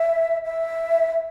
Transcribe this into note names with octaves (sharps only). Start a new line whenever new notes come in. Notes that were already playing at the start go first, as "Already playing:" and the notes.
Already playing: E5
E5